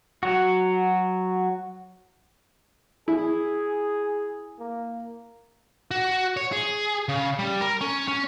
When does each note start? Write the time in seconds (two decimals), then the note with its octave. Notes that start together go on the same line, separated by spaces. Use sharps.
0.23 F#3 F#4
3.08 E4 G#4
4.59 A#3
5.91 F#4
6.37 C#5
6.52 G#4
7.09 C#3
7.39 G3
7.61 A#4
7.81 C#4
8.08 C#4